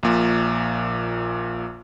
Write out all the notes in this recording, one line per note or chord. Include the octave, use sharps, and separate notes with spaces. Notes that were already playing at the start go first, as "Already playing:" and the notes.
A#1 A#2